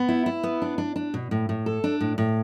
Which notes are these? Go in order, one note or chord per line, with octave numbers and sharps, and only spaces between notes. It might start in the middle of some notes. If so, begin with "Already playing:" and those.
Already playing: B3
E4
E4
B3
D4
D4
D4
B2
A2
A2
A4
D4
A2
A2